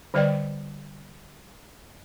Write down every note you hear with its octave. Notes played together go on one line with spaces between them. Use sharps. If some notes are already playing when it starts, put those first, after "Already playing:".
D3 G3 B4 D5 D#5 G5